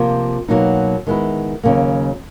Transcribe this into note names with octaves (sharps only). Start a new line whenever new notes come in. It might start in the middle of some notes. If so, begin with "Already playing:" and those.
Already playing: C3 F3 A#3
B2 F#3 A#3 D#4
D#3 G#3 B3 E4
D#2 C#3 F#3 A#3